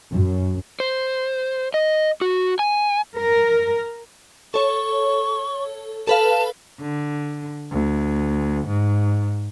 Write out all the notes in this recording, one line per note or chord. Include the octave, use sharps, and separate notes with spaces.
F#2
C5
D#5
F#4
G#5
A#4
A4 C#5 C#6
A4 B4 F5 A5
D3
D2
G#2